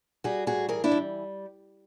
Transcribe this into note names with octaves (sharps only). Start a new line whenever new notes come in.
G3 F#4 G#4
A2 F#4 G#4
E3 G#4 A#4
D4 E4
G3